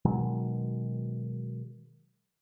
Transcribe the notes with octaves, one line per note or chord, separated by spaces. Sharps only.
B2 D#3 F#3 G#3